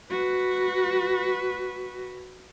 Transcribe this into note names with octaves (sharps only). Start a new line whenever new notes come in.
F#4 B4